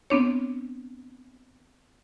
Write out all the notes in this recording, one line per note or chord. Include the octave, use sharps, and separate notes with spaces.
B3 C4 D4 C#5